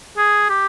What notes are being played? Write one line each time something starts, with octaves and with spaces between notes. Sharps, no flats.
G#4
G4